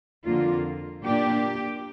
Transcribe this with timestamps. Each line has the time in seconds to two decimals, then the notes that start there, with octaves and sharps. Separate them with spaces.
0.24 F2 D3 A#3 F4
1.04 A#2 A#3 D4 G4